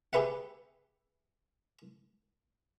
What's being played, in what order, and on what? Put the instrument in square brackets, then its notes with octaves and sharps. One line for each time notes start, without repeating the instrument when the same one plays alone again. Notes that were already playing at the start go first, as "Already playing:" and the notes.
[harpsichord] G4 G#4 B4 E5 F#5